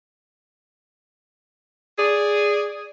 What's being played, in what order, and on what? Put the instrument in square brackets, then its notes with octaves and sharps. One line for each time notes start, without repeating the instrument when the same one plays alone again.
[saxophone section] G#4 D5